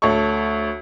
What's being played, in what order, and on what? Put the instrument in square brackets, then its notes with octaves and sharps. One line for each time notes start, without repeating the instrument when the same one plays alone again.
[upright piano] D2 A4 C#5 C#6